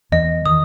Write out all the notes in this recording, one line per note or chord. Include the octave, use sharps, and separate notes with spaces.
E2 E3 D#5
D#3 D#6